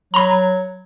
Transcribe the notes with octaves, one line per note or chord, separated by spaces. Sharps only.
F#3 A#5 B5